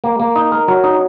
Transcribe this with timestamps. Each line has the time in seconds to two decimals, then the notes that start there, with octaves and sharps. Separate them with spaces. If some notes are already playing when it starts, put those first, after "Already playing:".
0.04 A#3
0.20 A#3
0.36 D#4
0.52 A#4
0.68 F#3
0.84 D#4